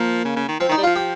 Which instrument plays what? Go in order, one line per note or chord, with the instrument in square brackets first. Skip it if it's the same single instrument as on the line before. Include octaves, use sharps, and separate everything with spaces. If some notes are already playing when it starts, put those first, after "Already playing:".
Already playing: [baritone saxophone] F3 [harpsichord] A#3
[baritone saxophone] C#3
C#3
D#3
[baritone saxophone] F3 [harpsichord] C4
[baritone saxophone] D#3 [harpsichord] D#4
[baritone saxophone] G3
[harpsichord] F4
[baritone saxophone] F3
[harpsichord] G4